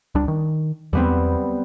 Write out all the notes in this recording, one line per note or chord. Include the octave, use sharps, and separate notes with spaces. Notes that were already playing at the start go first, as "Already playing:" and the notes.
C#2 G3 D4
D#3
E2 G3 B3 C4